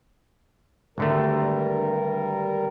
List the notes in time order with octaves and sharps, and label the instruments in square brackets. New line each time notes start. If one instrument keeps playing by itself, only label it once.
[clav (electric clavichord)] G#1 D3 A3 [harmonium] G2 G3 A#4